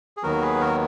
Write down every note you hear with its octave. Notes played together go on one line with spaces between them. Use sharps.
G#4
D#2 D#3 F#3 B3 F#4 A#4
G#4 B4
F#4 A#4